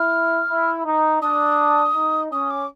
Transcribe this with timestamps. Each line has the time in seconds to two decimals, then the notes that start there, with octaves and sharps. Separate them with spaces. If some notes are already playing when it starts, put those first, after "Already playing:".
Already playing: E4 F6
0.49 E4
0.85 D#4
1.22 D4 D#6
1.95 D#4
2.32 C#4 D#6
2.50 D6